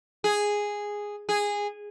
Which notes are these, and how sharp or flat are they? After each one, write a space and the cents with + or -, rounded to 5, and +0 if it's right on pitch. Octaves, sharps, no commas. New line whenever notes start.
G#4 -5
G#4 -15